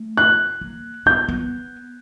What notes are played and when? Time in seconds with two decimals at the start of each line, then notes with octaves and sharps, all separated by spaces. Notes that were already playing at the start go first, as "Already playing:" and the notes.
Already playing: A3
0.17 F#6
0.61 A#3
1.06 B3 G6
1.29 B3